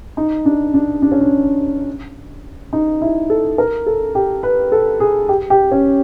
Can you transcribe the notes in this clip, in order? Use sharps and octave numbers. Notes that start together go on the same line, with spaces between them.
D#4
D4
D4
D4
C#4
D4
D#4
E4
A4
A#4
A4
G4
B4
A4
G#4
G4
G4
C#4